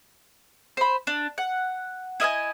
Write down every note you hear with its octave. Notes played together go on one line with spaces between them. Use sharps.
C5 B5
D4
F#5
E4 D#5 F5 G#5